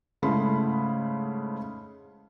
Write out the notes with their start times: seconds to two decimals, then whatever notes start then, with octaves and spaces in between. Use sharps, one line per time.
0.22 G#2 C#3 A3 E4 B5 C6